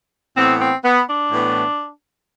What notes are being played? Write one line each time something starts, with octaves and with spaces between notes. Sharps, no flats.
A2 E3 B3 C4
C4
B3
D4
A2 E3 B3